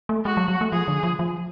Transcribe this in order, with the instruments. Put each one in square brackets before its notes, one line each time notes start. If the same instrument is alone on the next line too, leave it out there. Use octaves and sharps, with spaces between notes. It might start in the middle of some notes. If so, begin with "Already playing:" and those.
[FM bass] A3
[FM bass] G#3 [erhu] F#4
[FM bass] F#3
F#3
A3
[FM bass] F3 [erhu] G#4
[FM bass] D3
F3
F3